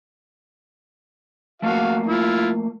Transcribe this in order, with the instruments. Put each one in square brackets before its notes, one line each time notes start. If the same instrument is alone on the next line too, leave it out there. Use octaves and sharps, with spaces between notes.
[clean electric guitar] F3 A3 A#3 [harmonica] F#4 F5
[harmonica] E4 F4